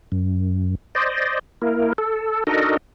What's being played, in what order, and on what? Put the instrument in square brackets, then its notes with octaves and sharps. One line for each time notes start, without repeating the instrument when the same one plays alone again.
[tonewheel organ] F#2
C5 D5 D#5
A#3 E4 A#4
A4
D4 D#4 F#4 A4 A#4 D#5